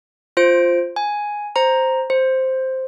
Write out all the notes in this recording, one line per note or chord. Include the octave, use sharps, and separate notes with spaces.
F4 C5 D7
G#5
C5 A#5
C5